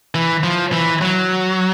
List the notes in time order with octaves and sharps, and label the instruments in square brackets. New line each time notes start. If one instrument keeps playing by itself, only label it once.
[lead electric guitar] E3
F3
E3
F#3